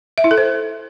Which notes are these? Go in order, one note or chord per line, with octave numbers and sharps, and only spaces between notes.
E5
E4
A4
C5